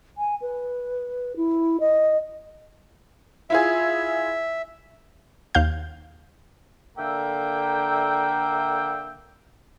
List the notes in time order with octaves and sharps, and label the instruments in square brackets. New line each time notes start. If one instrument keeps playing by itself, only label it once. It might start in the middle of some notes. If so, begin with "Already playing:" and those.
[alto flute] G#5
B4
E4
D#5
[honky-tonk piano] E4 F4 G#4 [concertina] E5
[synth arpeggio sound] D#2 F5 G6
[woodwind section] D3 A#3 E5 G5